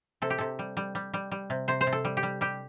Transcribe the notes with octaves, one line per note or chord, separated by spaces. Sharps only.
C3 A4
G4
C3 A4
G3
G3
G3
G3
G3
C3
C3 C5
C5
C3
A4
G3
G4
G3
G3 G4